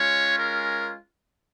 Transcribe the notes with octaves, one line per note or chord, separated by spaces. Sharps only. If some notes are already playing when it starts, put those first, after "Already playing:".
Already playing: G#3 C#4 F4 C#5
A#4